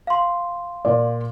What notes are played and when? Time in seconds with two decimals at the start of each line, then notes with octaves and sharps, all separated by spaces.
0.07 F5 C6
0.85 A#2 D5